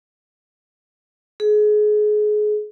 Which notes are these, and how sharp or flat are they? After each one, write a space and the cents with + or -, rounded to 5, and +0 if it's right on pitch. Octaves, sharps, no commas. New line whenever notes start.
G#4 +25